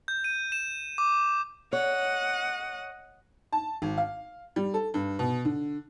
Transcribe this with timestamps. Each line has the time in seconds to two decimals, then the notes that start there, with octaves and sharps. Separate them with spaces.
0.08 G6
0.24 D#7
0.52 E7
0.98 D6
1.73 C#5 D#5 F#5
3.53 A5
3.82 G#1
3.97 F5
4.56 G3
4.74 A4
4.94 G2
5.19 B2
5.45 D3